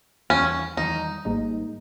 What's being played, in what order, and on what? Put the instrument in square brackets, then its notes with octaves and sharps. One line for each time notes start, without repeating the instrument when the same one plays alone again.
[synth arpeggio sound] E2 D#3 G3 [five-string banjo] C#4
[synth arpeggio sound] E2 D#3 G3 [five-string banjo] D#4
[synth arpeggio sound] G#1 G#2 G3 A#3 D#4